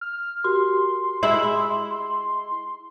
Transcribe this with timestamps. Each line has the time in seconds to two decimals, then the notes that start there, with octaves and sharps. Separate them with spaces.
0.01 F6
0.44 F#4 G4 A#4 C6
1.23 G#3 E4